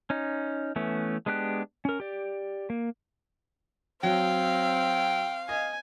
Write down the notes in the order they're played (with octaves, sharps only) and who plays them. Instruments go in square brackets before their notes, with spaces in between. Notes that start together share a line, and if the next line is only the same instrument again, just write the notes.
[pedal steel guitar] C#4 D#4
E3 A3 B3 C#4
G#3 B3 D4 G4 F#6
C#4 A#4
G4 D5
A#3
[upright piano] F#3 [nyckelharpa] C4 [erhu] F5 [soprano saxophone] G5
[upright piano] D#5 [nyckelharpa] G#5